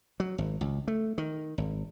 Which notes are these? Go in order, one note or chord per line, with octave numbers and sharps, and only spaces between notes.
F#3
G#1
C#2
A3
D#3
G#1